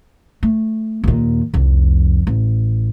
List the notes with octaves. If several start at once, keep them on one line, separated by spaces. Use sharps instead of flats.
A3
D#2 A#2
C2 F2
A1